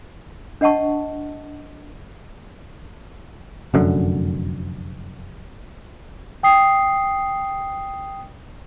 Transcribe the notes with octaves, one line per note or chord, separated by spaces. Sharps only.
D4 D#5 F#5 A5 C#6
F1 F#2 D3
G5 D#6 C7